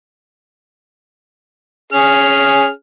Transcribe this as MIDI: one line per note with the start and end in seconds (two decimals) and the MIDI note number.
1.93 2.69 61
1.93 2.69 68
1.93 2.69 89